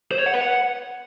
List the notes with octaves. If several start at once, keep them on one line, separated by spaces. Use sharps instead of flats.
C5
C#5
F#5
B4
F#5